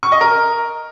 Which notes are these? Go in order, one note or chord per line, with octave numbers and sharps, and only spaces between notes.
C#6
D#5
A#4